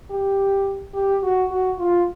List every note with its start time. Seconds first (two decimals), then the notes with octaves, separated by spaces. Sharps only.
0.10 G4
0.94 G4
1.23 F#4
1.51 F#4
1.79 F4